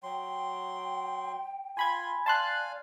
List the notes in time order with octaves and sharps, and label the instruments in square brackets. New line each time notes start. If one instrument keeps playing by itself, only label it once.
[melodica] F#3 C6 [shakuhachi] G5
[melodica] F4 C6 [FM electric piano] G#5 B5 G#6
[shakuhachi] D5 [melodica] F5 G#5 [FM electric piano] A5 C6 F#6